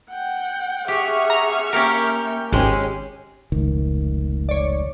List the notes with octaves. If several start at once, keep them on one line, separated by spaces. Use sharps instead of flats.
F#5 G5
G4 G#4 E5 F#5 C#6 F6
A#5
A#3 C#4 G4 A#4 G5
G#1 G#3 C#4 G4 G#4
F1 C#2 D#3
C#5 D5